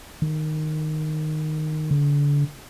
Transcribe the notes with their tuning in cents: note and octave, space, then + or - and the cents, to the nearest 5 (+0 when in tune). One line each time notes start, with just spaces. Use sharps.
D#3 -10
D3 -30